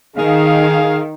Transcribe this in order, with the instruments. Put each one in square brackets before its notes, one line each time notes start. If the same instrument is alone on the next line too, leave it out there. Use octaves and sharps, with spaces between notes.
[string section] D#3 [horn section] G#4 F5